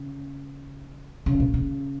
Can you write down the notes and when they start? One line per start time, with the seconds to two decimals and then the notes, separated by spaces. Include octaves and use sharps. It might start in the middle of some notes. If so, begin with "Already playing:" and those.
Already playing: C#3
1.26 C#3
1.40 A#2
1.54 C#3